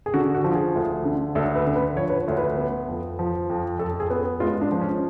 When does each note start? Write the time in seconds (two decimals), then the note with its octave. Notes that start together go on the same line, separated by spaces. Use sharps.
0.06 G#4
0.14 D3 F#4
0.35 F#4
0.44 F3
0.55 G#4
0.75 D2
1.05 D3
1.35 D2 A4
1.55 B4
1.66 D3
1.76 B4
1.96 F3 C#5
2.10 B4
2.17 C#5
2.28 D2
2.37 B4
2.57 B3
2.88 F2
3.19 F3
3.50 F2
3.79 F2 A4
4.00 G#4
4.10 B3
4.40 G#3 F4
4.61 D4
4.71 F3
4.81 C#4